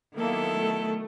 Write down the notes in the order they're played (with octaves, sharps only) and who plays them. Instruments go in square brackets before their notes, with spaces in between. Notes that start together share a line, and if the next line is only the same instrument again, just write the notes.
[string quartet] D#3 F#3 B3 E4 A4 [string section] A#3
[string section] A3